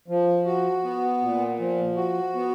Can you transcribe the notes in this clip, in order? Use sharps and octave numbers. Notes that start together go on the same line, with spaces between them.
F3
F#4
B3
A#2
F3
F#4
B3